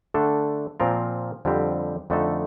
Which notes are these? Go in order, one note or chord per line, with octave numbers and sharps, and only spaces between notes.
D3 A3 D4 A4
A#2 F3 C4 F4 A#4
F2 D3 G3 C4 G4
F2 D3 A3 D#4 A4